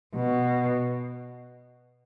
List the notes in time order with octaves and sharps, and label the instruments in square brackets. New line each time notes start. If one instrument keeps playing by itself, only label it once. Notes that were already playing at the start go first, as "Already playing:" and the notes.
[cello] B2